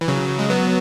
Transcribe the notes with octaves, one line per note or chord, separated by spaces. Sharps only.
E3
C#3 F#3
G#3
F#3 B3